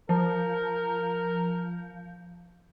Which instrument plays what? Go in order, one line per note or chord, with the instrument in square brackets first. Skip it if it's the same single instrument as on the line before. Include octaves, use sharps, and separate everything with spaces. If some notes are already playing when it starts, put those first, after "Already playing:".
[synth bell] F3 [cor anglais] A#4